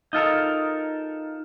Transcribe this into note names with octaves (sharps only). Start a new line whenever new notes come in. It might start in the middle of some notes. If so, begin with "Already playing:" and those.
D#4 F4 A4 A#4